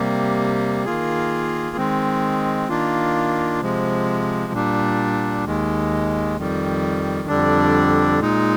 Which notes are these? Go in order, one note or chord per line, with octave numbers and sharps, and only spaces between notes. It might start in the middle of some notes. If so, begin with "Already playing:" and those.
Already playing: C3 G3 A#3
D#3 A#3 F4 G#4
D#3 G#3 C4
D#3 A#3 D4 F4
C3 F3 G#3
A#2 G3 D4
D#2 D#3 G#3
F2 D#3 G3
F2 D3 G3 D4
A#2 G#3 D#4